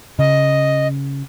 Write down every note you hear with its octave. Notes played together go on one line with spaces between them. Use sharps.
C#3 D#5